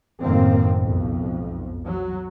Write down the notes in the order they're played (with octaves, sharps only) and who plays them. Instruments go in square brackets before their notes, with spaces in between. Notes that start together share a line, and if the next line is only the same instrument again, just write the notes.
[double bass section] F#1 F#2 A2 D#3 A#3 C4
B1 F2 G#2
F#3